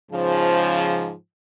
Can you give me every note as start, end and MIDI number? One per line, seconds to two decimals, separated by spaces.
0.12 1.12 44
0.12 1.12 49
0.12 1.12 53